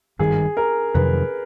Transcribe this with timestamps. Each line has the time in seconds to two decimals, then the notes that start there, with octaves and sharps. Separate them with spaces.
0.19 G#1 G2 D#3 G#4
0.57 A#4
0.94 F2 C3 D#3 F#3 B4